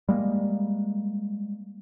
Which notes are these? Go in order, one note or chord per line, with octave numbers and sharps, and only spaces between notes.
G3 G#3 A#3